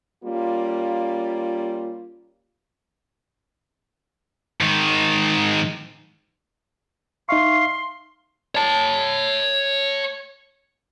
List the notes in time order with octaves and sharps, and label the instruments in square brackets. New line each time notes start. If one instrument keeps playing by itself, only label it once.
[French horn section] G3 A#3 C#4 F4
[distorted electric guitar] G#2 D#3
[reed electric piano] D#4 E5 C#6 [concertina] F5 [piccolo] C6
[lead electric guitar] C#5 A5